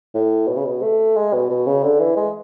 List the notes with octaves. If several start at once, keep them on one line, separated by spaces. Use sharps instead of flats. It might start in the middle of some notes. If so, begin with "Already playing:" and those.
A2
B2
C#3
B2
A3
G#3
B2
B2
C#3
D3
E3
G#3